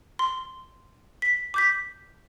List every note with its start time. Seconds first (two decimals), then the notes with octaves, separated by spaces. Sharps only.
0.19 C6
1.22 B6
1.54 D6 G6 B6